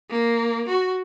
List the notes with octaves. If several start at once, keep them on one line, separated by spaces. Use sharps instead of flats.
A#3
F#4